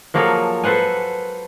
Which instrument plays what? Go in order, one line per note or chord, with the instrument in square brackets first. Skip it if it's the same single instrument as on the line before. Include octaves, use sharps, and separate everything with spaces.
[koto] F3 F#3 A#3 G#4 A4 C#5
A4 B4 C5 F#5 G#5